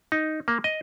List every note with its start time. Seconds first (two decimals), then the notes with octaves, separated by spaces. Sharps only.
0.12 D#4
0.48 A#3
0.64 D#5